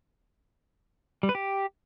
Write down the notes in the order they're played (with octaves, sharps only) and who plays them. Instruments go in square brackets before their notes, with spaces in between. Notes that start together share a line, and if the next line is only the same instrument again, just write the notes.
[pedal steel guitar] G3
B4
G4